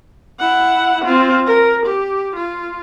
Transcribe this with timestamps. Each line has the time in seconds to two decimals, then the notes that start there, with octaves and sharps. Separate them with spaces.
0.39 E4 F#5
1.05 C4 F4
1.47 A#4
1.86 G4
2.36 F4